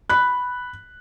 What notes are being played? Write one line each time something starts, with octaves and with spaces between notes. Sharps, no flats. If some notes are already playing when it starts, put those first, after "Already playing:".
B5 F#6